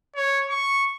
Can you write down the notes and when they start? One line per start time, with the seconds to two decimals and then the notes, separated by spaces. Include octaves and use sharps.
0.16 C#5
0.50 C#6